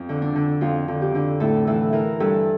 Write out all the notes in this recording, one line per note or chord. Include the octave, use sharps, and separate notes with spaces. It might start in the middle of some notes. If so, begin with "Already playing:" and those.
Already playing: F2
D3
D4
D3
F2 F4
D3
G4
D3
A2 A4
E3 A4
E3 A#4
G2 A4